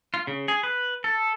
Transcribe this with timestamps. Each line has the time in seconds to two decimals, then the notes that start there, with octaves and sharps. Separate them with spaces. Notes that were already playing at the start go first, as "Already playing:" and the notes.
0.14 F4
0.27 C#3
0.48 G#4
0.63 B4
1.04 A4